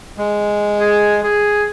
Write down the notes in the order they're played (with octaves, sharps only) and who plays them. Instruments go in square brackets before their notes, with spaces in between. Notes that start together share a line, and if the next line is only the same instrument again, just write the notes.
[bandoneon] G#3
[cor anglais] G#4
G#4